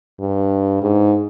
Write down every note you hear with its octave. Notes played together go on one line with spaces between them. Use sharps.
G2
G#2